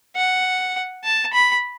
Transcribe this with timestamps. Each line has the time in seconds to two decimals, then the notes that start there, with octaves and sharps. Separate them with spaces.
0.16 F#5
1.04 A5
1.33 B5